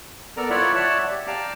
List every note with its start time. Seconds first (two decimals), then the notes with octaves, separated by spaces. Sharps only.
0.37 B3 A4 A#4 D5 A#5
0.50 E4 F4 C#5 D5 E5 F#5
0.75 C#5 D5 E5 F#5 A5
1.11 G4
1.27 D5 F5 G5 A5 A#5